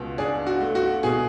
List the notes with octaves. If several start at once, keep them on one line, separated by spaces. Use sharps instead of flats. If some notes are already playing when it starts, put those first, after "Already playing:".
Already playing: C#2 B2
D4 G#4
F#4
A3
F#4
B2 G#4